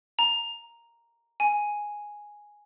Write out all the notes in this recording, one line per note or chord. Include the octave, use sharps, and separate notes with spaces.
A#5
G#5